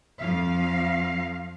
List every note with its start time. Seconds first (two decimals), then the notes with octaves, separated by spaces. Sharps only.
0.20 F2 F3 F5